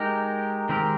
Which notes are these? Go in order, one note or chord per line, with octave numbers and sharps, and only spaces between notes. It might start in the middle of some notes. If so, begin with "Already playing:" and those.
Already playing: G#3 D#4 G4 A#4
D#3 G#3 C4 G4 A#4